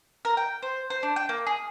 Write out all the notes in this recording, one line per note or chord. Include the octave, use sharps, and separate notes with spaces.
A#4
G5
C5
C5
D4
G5
A#3
G#4